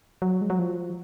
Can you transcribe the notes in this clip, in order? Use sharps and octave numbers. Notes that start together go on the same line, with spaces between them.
F#3
G#3
F#3
F3